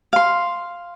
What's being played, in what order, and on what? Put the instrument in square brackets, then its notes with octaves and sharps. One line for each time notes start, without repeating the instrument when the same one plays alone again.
[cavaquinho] F5 C6